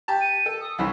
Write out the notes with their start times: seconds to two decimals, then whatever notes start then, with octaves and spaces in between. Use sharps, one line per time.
0.08 G4 A5
0.21 D#7
0.46 A4
0.61 D#6
0.78 C2 E3 C#4